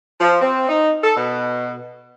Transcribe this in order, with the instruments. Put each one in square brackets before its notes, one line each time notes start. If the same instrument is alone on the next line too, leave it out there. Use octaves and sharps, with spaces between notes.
[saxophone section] F3
C4
D#4
A4
B2